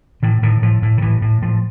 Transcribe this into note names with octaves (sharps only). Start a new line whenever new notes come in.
A2 E3
A2 D#3
A2 F3
A2
D#3
A2 E3
A2
A2 F3